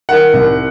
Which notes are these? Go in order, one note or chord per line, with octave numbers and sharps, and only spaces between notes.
D#3 F#5
C2